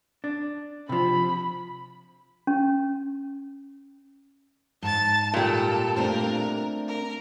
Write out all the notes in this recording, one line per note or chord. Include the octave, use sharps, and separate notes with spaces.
D4
C3 F3 B5
C#4
G#2 A5 A6
A#2 G3 A4
A3 C4 D4 A#4
A#4